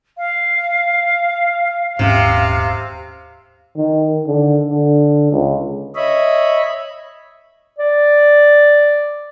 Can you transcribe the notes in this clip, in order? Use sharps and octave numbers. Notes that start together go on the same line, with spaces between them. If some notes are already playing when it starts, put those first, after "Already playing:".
F5
D#1 G#2 C3 C#4 F5
D#3
D3
D3
C#2
C#5 D#5 E5 B5
D5